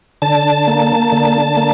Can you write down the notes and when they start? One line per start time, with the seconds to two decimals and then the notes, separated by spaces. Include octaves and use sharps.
0.22 D3 A5
0.67 A#3
1.12 D3
1.57 A#3